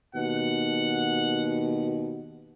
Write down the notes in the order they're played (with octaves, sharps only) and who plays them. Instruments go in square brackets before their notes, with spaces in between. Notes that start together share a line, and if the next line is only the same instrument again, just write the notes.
[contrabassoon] D#2 [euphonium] B2 [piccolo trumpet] F#5